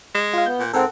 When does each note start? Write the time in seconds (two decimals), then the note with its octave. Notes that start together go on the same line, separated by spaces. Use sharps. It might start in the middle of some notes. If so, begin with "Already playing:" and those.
0.15 G#3
0.33 F4 F5
0.46 B3 G6
0.59 A#2
0.73 G#2 C4 A4 A#4 F#5